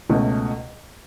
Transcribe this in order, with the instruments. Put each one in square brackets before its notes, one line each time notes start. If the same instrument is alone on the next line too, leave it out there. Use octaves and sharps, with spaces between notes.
[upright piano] C#2 B2 A3 C#4